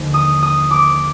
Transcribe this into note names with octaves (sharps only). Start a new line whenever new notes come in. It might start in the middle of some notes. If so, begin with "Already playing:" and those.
Already playing: D#2 D3 F3
D#6
D#6
D6